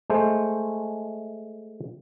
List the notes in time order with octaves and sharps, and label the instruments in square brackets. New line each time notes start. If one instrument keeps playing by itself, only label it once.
[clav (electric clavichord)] G#3 A3 C5